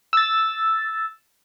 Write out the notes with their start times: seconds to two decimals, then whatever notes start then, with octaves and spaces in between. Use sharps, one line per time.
0.13 E6 A6